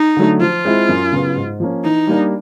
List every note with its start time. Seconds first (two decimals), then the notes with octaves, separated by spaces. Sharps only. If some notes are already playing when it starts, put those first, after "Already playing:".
Already playing: D#4
0.17 D3 F#3 A3
0.40 F3 F4
0.65 G#3 C4 E4
0.89 F#2
1.13 C#3 F#3 B3
1.36 G#2
1.60 F3 A#3 C#4
1.84 E3 D#4
2.07 G3 A#3 D4